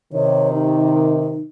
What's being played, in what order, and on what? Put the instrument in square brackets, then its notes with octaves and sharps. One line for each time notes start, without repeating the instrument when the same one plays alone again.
[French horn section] C3 D#3 [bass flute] C#5
[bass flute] D#4